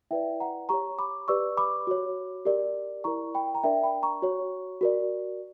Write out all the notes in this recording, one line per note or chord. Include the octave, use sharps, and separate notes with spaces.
E4 B4 D5 E5 G5
F#5 A#5
G4 C#5 A#5 C#6
B5 D6
G4 B4 D5 C#6 E6
B5 D6
F#4 C#5
G4 A#4 D5
E4 A#4 D5 A#5 C#6
G5 B5
A#5
D4 A#4 D5 E5 G5
G5 B5
A#5 C#6
F#4 C#5
F#4 A#4 D5